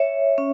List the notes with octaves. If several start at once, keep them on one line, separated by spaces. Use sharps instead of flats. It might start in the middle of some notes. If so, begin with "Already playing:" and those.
Already playing: C#5 E5
C#4